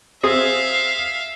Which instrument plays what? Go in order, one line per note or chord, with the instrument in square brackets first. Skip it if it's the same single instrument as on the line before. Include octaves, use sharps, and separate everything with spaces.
[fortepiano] C4 G#4 D#6 [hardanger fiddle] E5 F5